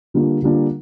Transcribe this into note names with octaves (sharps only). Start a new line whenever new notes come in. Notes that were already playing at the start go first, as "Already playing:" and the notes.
D3 G3 A#3 D4 F4
D3 G3 A#3 D4 F4